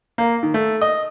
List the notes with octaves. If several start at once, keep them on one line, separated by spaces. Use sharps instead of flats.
A#3
D#3
A3
D#5